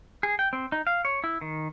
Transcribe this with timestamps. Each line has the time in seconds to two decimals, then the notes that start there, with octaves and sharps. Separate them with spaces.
0.23 G#4
0.39 G5
0.53 C4
0.72 D#4
0.87 F5
1.05 C#5
1.24 E4
1.41 D#3